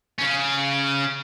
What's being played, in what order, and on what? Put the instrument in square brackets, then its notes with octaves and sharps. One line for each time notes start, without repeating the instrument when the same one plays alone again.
[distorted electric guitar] C#3 C#4